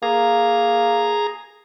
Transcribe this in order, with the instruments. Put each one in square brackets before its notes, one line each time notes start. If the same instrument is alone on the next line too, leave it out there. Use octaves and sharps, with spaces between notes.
[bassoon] A#3 [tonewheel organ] G#4 A#5